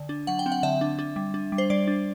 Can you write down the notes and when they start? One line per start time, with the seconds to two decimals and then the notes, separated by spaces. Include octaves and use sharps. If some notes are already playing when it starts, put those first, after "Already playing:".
Already playing: D3
0.09 D4
0.27 F#3 F#5
0.39 G5
0.46 C4
0.52 F#5
0.63 D3 E5
0.81 D4
0.99 D4
1.16 G3
1.34 D4
1.52 G3
1.58 C5
1.70 G3 D5
1.87 D4